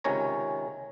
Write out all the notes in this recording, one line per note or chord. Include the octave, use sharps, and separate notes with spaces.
C#2 C3 D#3 C#4 C#5 A#5